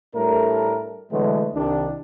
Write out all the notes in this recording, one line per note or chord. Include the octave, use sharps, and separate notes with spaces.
A2 G3 A3 D4 A#4
B2 D3 E3 F#3 G#3 A3
C2 D#3 D4